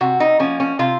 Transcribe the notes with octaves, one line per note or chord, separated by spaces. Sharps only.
C3 F#4
D#4
F3 A#3 C#4
C#4
C3 F4